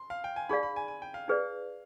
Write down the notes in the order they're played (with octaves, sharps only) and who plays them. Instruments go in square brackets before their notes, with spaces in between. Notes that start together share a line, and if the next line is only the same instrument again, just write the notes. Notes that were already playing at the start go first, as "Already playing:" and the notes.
Already playing: [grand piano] C6
F5
G5
G#5
[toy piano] D#4 G#4 D5 F5 [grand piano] B5
[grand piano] B5
G#5
G#5
G5
F5
[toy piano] D#4 G#4 B4 D5